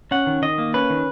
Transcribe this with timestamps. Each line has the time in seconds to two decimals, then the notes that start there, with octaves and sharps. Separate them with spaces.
0.11 C#4 F#5
0.27 D#3
0.42 D#3 D#5
0.58 A#3
0.74 C#4 B4
0.90 D#3